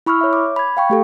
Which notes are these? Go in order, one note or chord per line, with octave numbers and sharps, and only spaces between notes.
E4 B5 C#6 E6 F6
C#5 E5
D6
B5 G#6
F5 G5 C#6
A3 G4 A4